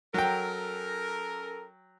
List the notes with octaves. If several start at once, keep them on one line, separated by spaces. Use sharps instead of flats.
F#3 C#4 A4 A#4 G5